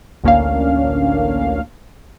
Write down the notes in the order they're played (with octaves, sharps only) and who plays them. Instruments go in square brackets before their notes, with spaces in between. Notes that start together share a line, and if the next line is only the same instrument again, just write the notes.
[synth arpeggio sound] A1 D2 A#3 C#4 D4 F5